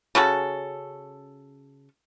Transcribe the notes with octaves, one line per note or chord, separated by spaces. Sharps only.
C#3 C#4 F#4 A4